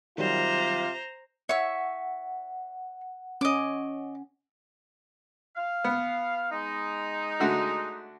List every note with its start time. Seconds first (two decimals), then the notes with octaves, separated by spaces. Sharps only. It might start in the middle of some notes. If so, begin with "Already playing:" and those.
0.18 C3 D#3 F#3 G3 F4 C5 A#5
1.49 C#5 E5 F#5 C#6
3.41 C#4 D#5 D6
5.57 F5
5.84 B3
6.51 G#3 D#4
7.40 D3 A3 F#4